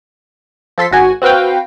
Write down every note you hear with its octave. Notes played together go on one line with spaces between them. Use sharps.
F3 A4 C6 B6
G#1 F#4 G#5
C4 F#4 B4 F5 G5